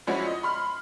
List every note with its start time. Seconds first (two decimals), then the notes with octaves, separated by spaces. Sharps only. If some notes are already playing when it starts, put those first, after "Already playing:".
0.07 F3 G#3 C#4 D4 E4 F#4
0.27 D#5
0.43 B5 C6 F6